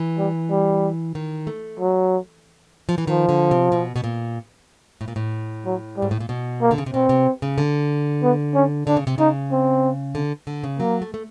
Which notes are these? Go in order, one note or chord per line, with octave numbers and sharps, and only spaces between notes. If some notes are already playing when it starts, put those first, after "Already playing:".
Already playing: E3
G3
G3
D#3
A3
F#3
F3
E3
D#3 F3
D3
C3
B2
B2
A#2
A2
A#2
A2
F#3
G3
G#2
A2
A#2
B2
A#3
D3
C#3
C3
B2 C4
C3
C#3
D3
B3
C#4
D3 D4
C#3
C3
C#3 D#4
C4
D3
D3
C#3
F#3 A#3
A3
A3